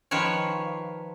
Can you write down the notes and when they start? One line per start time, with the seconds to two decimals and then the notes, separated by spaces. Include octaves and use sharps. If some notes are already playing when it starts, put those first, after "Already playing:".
0.11 D#3 F3 B4 C#5